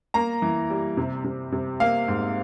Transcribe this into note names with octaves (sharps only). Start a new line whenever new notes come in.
A#3 A#5
E3
G3
C3
C3
C3
A#3 F5
G#2